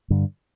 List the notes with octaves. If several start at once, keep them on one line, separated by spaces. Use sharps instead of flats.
G2 D3